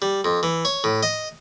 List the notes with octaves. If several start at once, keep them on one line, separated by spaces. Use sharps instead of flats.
G3
F2
E3
C#5
A2
D#5